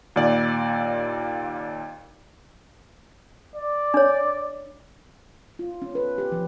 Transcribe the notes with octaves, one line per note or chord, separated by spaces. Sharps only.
D#2 A#2 D5
D5
D4 C#5
F4
C#4
B4
G4
F3